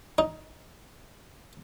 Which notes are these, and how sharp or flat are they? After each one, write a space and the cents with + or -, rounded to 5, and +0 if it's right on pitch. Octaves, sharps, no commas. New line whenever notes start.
D#4 +10